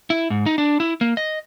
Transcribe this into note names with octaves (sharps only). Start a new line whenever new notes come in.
E4
G#2
D#4
D4
E4
A#3
D#5